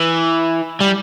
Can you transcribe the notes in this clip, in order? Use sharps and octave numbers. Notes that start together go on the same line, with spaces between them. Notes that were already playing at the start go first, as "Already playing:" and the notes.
Already playing: E3
G3